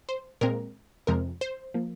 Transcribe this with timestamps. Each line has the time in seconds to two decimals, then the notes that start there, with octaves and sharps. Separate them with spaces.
0.09 C5
0.41 A#2 G#3 C4 A#4
1.07 F2 C3 F3 G#3 C4 A#4
1.41 C5
1.74 F3 A#3